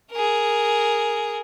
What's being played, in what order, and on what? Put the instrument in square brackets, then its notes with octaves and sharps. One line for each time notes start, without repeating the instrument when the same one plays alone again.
[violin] G#4 A#4